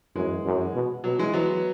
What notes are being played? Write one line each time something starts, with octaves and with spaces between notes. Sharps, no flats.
F#2 E3 G#3
F#2
B2
B2 F#3
E3 G#3
E3 F#3 B3